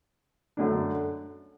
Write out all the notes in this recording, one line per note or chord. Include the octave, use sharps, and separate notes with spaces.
F#2 D3 A3 D4